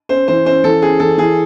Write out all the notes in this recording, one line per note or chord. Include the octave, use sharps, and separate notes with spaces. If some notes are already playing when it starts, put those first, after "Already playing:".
C#4 C5
E3 C5
C#4 C5
E3 A4
C#4 G#4
E3 A4
E3 G#4